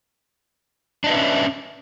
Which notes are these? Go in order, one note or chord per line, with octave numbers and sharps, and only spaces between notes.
C#4 D4 B4 D#5 E5